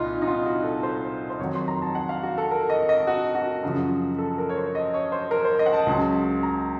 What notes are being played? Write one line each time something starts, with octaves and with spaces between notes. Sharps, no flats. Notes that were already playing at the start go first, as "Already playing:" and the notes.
Already playing: C2 A#2 D#4 F4
D#4
F4
F#4
A4
C5
C5
F2 D#3 F#3 C#5
C6
A#5
A5
F#5
F5
F#4
A4
A#4
D#5
D#5
F#4
F#4
F#2 C#3 F3
A4
A#4
C#5
C5
D#5
C#5
C5
A#4
C5
D#5
F#5
A5
C#2 C#3 F#3
A#5